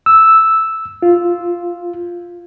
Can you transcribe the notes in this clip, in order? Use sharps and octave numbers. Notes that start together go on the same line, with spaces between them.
E6
F4